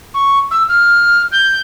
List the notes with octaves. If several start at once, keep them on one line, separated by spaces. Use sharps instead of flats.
C#6
E6
F6
G6